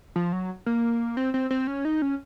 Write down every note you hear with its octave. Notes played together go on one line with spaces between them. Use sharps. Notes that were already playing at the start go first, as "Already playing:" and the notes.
F3
F#3
A#3
C4
C4
C4
C#4
D#4
C#4